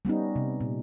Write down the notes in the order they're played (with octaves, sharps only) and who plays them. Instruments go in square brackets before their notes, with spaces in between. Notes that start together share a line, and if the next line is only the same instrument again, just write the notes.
[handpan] G3 B3 C#4 D#4
C3
A#2